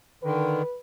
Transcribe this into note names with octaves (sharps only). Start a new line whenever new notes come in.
D3 D#3 B4